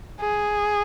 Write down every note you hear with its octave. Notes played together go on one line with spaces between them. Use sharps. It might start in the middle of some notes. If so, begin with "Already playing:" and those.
G#4